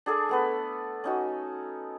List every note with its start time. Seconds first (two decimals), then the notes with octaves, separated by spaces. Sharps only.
0.06 D4 G#4 A4
0.29 A3 B3 B4
1.04 C#4 D#4 F#4